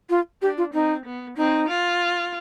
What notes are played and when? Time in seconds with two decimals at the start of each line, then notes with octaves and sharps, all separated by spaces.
0.10 F4
0.42 D4 G4
0.58 F4
0.74 C4 D#4
1.05 B3
1.37 C4 D#4
1.68 F4